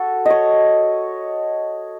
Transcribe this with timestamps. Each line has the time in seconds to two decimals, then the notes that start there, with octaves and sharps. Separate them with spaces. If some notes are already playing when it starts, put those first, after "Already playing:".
Already playing: F#4 A4
0.26 C#5 D#5